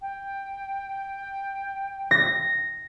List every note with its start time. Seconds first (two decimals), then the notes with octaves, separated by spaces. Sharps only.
0.02 G5
2.11 A#6